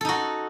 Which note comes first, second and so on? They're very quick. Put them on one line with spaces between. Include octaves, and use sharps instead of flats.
A4 D#4 F#4